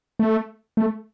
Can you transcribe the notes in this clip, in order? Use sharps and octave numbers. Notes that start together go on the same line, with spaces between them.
A3
A3